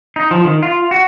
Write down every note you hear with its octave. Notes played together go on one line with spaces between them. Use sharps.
D#4
F3
D#3
F4
F#4